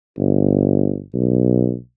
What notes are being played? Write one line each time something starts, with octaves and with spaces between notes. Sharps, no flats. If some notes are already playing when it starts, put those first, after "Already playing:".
G1
B1